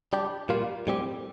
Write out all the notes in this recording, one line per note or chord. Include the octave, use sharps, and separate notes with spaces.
G3 D4 G4
A#2 G3 A#3 F4
A2 G3 C4 G4